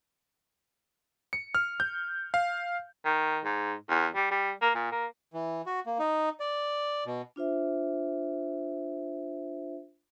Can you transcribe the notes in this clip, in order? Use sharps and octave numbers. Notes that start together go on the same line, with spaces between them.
C#7
F6
G6
F5
D#3
G#2
E2
G3
G3
A#3
A#2
A#3
E3
F#4
A#3
D#4
D5
B2
D4 F4 C5 E5